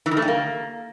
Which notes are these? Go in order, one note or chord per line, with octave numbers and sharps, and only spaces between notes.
E3
D#3
A3
G3
A#3